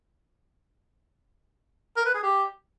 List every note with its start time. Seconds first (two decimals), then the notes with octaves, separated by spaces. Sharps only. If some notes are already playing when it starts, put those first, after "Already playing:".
1.97 A#4
2.05 B4
2.14 G#4
2.23 G4